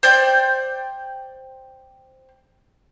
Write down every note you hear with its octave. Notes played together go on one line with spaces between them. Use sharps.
C5 D5 G5